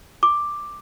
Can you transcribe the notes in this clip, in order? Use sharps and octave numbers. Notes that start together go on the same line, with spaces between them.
D6